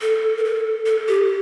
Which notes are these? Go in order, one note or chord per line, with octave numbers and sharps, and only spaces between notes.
A4
A#4
A4
A4
G4